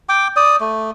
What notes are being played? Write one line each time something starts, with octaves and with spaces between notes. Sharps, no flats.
G5 D6
D5 D#6
A3